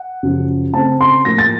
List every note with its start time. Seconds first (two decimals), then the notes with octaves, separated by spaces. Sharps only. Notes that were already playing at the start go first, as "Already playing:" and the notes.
Already playing: F#5
0.23 F#2 C#3 F3
0.74 C#3 A3 C4 A5
1.01 C6
1.25 A2 F3 A#3 A#6
1.38 A6